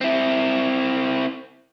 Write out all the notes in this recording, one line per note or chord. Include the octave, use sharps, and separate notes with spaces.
C4 E4